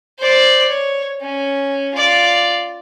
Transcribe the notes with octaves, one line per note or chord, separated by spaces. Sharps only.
C5 D5
C#5
C#4
F4 D5